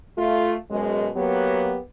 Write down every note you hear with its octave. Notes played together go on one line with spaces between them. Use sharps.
A3 F4
F#2 B2 G#3
F#3 A#3 B3 G4